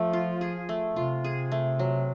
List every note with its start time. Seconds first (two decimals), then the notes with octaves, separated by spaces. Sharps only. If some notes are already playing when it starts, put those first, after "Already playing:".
Already playing: F3 A3
0.13 F4
0.41 G#4
0.69 A3
0.96 C3 F4
1.24 G#4
1.52 A3
1.79 F#3